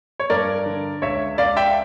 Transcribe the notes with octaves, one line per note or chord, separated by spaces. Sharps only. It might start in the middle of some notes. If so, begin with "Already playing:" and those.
C#5
G2 A#4 D5
D3
C#2 C#5 E5
C#2 D5 F5
E5 G5